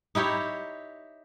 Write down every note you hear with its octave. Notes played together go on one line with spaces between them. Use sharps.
D#4 E4 G4 C#5